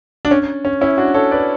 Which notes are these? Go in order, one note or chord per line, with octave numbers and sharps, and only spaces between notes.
D4
C#4
C#4
C#4 E4
D4 F#4
A4 C#5
B4 D5